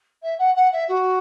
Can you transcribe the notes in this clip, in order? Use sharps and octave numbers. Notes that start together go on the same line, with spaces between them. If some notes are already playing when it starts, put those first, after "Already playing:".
E5
F#5
F#5
E5
F#4